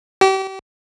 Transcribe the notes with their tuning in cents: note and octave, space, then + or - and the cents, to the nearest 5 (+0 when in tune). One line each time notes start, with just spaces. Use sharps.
G4 -35